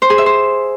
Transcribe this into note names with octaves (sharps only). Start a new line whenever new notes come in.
C5
G#4
E5
C5